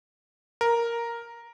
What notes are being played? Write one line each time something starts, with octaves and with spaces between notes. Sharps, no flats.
A#4